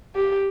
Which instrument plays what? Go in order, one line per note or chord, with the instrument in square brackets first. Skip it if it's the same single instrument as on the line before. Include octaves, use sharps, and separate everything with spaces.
[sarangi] G4